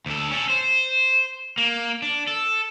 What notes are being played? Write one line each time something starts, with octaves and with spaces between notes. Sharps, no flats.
D2 A4
C#4 A4
C5
A#3
D4
A4